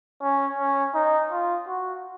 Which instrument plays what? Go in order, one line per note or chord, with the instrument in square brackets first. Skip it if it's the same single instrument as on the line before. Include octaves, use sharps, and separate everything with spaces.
[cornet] C#4
C#4
D#4
F4
F#4